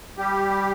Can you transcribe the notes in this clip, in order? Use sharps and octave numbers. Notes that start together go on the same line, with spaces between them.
G3 G4